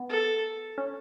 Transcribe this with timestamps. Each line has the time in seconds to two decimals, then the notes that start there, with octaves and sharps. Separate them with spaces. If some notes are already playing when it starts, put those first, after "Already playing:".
Already playing: B3
0.09 A4
0.78 C#4